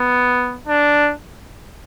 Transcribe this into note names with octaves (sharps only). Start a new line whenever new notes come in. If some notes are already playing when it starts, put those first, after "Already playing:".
Already playing: B3
D4